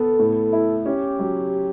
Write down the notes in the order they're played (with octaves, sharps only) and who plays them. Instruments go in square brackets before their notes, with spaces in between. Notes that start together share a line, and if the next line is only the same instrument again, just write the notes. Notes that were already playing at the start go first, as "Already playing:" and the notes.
Already playing: [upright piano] B3 [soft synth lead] A4
[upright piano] A2
E4
[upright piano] C#4 [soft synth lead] G4
[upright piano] F#3